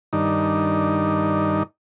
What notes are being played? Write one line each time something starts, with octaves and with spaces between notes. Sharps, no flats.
G2 D#3 D4 D#4